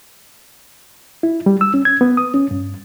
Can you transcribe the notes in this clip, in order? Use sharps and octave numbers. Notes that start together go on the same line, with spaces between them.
E4
G3
E6
C#4
G#6
B3
D#6
C#4
G2